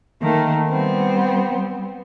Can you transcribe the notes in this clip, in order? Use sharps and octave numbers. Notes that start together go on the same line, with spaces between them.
D#3 A3 A#3
G3 B3 C4